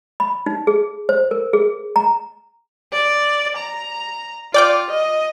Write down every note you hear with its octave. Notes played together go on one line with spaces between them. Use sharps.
B5
D#4
G#4
C5
A#4
G#4
A#5
D5
A#5
F4 D5 G5 D6
D#5